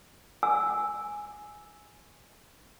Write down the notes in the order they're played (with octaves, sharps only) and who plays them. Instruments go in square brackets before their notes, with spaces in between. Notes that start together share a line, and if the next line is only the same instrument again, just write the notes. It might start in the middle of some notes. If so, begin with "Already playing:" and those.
[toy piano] G#5 E6